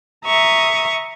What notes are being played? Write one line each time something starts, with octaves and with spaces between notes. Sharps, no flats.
E5 A#5 C#6 D#6